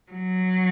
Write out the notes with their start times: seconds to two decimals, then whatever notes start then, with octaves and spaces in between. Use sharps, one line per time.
0.12 F#3